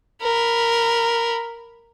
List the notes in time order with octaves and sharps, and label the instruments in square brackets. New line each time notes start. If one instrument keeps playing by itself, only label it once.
[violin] A#4 B5